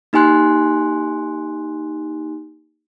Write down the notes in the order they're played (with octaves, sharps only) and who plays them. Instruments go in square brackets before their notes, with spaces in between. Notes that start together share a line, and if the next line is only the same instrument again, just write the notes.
[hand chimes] A#3 D#4 G4 G#5 C6 F#6